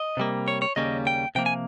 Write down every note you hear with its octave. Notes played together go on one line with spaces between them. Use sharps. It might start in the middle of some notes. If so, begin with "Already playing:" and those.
Already playing: D#5
C3 G3 A#3
C#5
C#5
D#2 C#3 G3 A#3 C#4 D#5
G5
C3 F3 A#3 G5
G#5